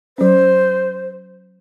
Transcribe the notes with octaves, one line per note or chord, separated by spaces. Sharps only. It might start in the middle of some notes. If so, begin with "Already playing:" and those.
F#3 C#4 C5